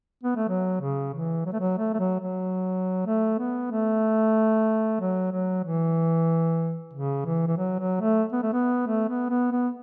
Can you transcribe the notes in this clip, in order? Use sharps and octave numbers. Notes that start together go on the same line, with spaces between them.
B3
A3
F#3
C#3
E3
F#3
A3
F#3
A3
A3
F#3
F#3
A3
B3
A3
F#3
F#3
E3
C#3
E3
E3
F#3
F#3
A3
B3
A3
B3
A3
B3
B3
B3